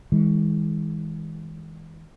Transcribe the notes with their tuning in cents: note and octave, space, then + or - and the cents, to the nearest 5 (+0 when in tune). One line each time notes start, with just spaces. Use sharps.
D#3 +45 G#3 -25